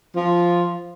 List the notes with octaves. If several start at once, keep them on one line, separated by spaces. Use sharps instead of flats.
F3